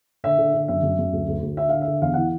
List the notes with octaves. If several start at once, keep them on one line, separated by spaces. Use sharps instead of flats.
D3 E5
D3
D3
F#2 E5
F#2
F#2
D2
D2
D2
D3 E5
D3 F5
E5
D3
E2 F5
E3 F#5